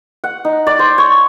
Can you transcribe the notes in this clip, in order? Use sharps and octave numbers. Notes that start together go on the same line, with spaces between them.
F#5
D#4
D5
C5
C#5